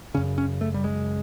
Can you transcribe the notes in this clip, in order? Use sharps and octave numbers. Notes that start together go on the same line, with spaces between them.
F#2 C#3 C#4
C#4
A3
G3
G#3